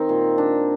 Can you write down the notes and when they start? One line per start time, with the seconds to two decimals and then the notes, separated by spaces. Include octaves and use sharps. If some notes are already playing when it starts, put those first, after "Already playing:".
Already playing: D#3 C4
0.09 A#2
0.38 D4